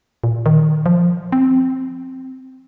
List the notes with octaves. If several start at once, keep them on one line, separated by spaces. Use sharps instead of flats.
A#2
D#3
F3
C4